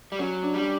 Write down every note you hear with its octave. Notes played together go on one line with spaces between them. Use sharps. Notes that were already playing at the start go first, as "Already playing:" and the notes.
G3
F#3 C#4
D4
G3 D4